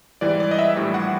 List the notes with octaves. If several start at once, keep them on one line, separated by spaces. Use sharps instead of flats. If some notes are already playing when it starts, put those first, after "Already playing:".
G#2 E3 G3 D5
D5
D#5
E5
A#1 A2 E3 G3
F#5